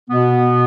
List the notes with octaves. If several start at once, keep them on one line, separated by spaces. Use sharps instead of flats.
B2 B3